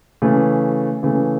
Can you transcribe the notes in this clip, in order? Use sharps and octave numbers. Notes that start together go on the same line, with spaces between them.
C#3 E3 A3
C#3 E3 A3